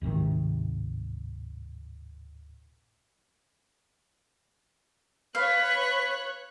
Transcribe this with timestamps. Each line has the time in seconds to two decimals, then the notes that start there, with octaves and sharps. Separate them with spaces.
0.01 D1 G#1 C3 D#3
5.35 B4 C#5 F5 F#6